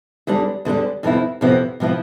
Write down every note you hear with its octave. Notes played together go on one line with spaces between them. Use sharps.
E2 D3 G3 D4
E2 D3 G3 D4
F2 C3 F3 B3 E4
F2 C3 F3 B3 E4
C3 F3 B3 E4